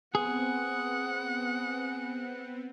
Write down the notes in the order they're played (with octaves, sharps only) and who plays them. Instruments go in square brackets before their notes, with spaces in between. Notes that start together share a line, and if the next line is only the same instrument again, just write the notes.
[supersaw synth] B3 C4 [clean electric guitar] G#4 [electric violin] F#5